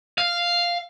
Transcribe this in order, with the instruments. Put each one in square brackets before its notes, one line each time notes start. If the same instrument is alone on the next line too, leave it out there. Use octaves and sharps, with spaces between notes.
[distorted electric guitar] F5